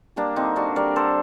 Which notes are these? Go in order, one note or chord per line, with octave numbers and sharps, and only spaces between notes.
G3 A#3 D4
D3 C4 D#4
G3 D4 F#4
G3 A#4 D5
D3 A4 C5